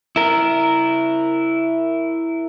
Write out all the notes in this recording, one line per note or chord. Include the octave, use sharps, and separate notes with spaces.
E4 A#4